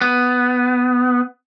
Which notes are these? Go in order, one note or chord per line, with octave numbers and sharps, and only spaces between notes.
B3